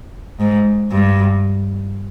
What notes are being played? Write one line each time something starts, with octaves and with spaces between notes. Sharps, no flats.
G#2
G2